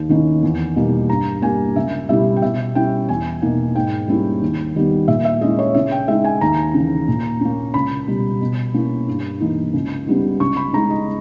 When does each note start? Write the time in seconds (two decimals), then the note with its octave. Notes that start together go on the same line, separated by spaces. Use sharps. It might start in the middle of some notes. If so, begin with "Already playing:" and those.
Already playing: D#2
0.09 D#3 A#3 C#4 E4
0.43 E2
0.76 B2 G3 A#3 D#4
1.09 G2 A#5
1.42 G3 A#3 G#5
1.76 C#2 E5
2.09 B2 G3 C#4 E4 E5
2.36 G5
2.42 B2 E5
2.75 G3 C#4 E4 G5
3.09 E2 G#5
3.42 B2 A#3 D#4
3.75 G#2 G5
4.08 G3 A#3 C#4 E4
4.42 D#2
4.75 D#3 G3 B3
5.08 A#2 E5
5.25 E5
5.41 G#3 C#4 E4 D#5
5.59 C#5
5.74 C#3 E5
5.91 G5
6.08 G#3 D#4 E5
6.25 G#5
6.41 D#2 A#5
6.74 C#3
6.80 E3
7.08 A#2
7.41 A#3 C#4
7.74 C#2 B5
8.08 B2 G3
8.41 B2
8.74 A#3 C#4 E4
9.07 G2
9.40 E3 A#3 D#4
9.74 C#2
10.07 C#3 G3 B3 D#4
10.40 C#2 C#6
10.57 B5
10.73 C#3 G#3 D#4 A#5
10.90 D#5